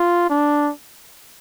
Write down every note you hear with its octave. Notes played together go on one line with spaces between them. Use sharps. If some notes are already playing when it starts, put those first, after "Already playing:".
Already playing: F4
D4